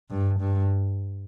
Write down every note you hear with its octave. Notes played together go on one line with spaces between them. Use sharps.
G2
G2